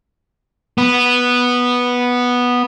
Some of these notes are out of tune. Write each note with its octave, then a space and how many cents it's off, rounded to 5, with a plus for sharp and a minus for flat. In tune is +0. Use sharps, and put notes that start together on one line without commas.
B3 -5